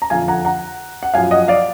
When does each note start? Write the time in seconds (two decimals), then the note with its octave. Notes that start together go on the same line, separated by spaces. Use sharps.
0.02 A#5
0.10 F2 D3 F3 F5 G#5
0.28 F#5 A#5
0.45 F#5 A#5
1.03 F#5
1.14 F#2 F3 F5 G#5
1.31 D#5 F#5
1.48 D5 F5